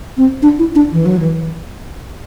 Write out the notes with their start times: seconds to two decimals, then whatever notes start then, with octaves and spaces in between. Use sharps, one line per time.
0.17 C4
0.42 D4
0.59 E4
0.75 D4
0.92 E3
1.06 F#3
1.20 E3